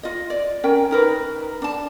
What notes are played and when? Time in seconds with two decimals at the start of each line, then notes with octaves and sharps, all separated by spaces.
0.03 F4 D#5
0.30 D5
0.63 C#4 A#4 G5
0.91 D#4 A#4 B4
1.62 D4 A5